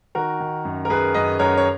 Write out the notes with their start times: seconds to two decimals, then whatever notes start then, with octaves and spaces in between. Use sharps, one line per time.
0.15 D#3 F#4 A#4
0.40 D#3
0.65 F#2
0.85 A#4
0.89 F#2 G#4 B4
1.14 F#2 B4 D#5
1.39 F#2 A#4 C#5
1.57 C#5